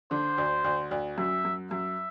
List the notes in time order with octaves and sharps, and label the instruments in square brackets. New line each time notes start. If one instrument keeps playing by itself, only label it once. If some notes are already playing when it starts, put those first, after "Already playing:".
[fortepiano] D3 [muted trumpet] C5
[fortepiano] D2
D2
D2
[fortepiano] F#2 [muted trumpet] E5
[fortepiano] F#2
[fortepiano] F#2 [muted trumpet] E5